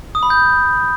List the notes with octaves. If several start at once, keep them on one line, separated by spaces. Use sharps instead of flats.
D#6
B5
G6